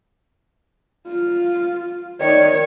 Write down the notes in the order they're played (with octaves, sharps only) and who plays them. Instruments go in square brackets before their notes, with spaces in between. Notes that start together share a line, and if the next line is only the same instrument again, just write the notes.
[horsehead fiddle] F4
[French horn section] D#3 D5 [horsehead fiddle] C#5